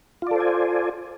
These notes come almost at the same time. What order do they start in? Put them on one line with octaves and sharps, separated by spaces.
F4 D5 A4 C5 G#5